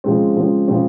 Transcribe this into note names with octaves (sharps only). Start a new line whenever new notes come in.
C#3 F3 G#3 C4
C#3 F3 G#3 C4
C#3 F3 G#3 C4